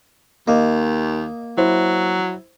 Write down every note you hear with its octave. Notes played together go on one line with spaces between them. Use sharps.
D#2 A#3 D#5
F#3 E4 C5